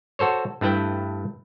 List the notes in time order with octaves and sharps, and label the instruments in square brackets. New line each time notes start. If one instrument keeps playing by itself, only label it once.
[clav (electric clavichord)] F#4 A4 C5 C#5
G2 A3 E4 B4 G5